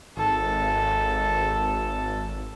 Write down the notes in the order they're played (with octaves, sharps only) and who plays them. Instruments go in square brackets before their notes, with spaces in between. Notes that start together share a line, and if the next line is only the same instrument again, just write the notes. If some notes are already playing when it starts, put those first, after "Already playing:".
[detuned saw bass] G#1 [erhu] A4